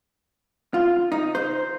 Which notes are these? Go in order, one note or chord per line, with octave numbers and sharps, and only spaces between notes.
F4
D#4
C5